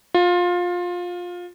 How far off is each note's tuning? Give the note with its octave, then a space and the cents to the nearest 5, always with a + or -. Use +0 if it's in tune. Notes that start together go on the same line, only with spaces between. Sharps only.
F4 +20